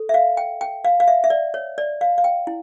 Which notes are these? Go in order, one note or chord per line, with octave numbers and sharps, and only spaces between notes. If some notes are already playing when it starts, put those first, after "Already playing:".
Already playing: A4
E5
F5
G5
G5
F5
F5
E5
E5
D5
C#5
D5
F5
F5
G5
E4